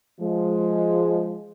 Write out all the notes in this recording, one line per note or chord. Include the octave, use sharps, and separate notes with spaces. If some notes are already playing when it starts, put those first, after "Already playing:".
F3 G#3